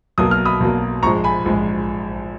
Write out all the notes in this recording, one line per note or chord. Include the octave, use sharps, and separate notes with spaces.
B1 B2 F#3 A#3 D#6
F6
B5 D#6
B1 B2 F#3 A#3
A#1 G#2 F3 G#3 A#5 C#6
G#5 B5
A#1 G#2 F3 G#3